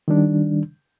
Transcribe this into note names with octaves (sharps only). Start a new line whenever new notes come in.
D#3 G3 D4